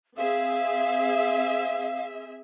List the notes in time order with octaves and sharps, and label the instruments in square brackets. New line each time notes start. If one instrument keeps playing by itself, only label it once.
[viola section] C4 G#4 E5 [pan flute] F5